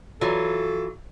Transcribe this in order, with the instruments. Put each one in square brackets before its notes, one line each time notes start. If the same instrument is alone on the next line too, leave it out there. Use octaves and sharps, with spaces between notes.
[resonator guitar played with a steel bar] E3 F#3 F4 [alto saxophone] A4